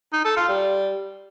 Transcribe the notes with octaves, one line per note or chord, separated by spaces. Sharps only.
D#4
A4
F4
G3